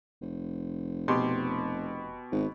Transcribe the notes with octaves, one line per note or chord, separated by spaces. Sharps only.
F1
B2 G4 C6
G#1